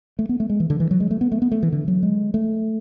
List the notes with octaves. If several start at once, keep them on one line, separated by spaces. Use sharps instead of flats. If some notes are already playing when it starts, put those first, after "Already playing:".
A3
B3
A3
G#3
E3
D3
E3
F#3
G#3
A3
B3
A3
B3
A3
E3
D3
F#3
G#3
A3